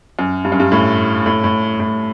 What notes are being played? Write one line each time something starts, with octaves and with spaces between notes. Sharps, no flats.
F#2
G2
F#2
G2
A2
A2
A2
A2